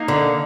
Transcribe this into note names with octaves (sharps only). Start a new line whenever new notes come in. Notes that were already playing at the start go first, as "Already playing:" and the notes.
Already playing: A#3 D#4
D3